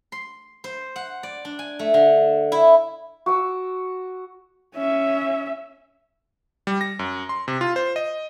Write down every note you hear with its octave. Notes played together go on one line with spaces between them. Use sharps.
C6
C5
F#5
D5
D4
G#5
A3
D3
E4
F#4 D6 E6
C#4 E5
G3
A#6
F#2
C6
C3
F4
C5
D#5